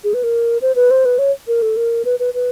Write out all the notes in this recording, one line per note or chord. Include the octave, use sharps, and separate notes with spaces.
G#4
B4
A#4
C5
B4
C5
B4
C#5
A#4
A4
A#4
B4
B4
B4